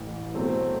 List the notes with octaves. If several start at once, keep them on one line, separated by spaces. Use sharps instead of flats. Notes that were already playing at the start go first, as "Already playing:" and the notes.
Already playing: A1 A2 E3
B2 F#3 A3 C4